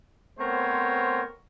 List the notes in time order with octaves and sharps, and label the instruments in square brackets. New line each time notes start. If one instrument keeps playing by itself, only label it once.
[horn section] A3 B3 C4 A#4 C5 C#5